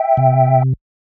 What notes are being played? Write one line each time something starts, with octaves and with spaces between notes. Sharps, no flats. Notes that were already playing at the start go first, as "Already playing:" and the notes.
Already playing: E5 G5
C3